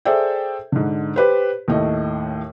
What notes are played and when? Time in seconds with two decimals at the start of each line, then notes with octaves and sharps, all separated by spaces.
0.05 G#4 A4 C5 D5 E5 G5
0.72 G#2 D3
1.16 G4 B4 C5
1.68 D#2 A2 A3 D#5